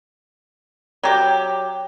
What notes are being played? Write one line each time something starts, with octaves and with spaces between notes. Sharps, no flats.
F#3 G4